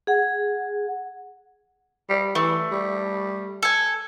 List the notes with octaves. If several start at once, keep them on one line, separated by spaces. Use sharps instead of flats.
G#4 F#5
G3
E3 A3
G3
A4 G#5